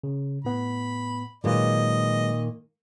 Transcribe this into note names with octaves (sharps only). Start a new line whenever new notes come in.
C#3
A2 B3 B5
A#2 D#3 F#3 G#3 B4 D#5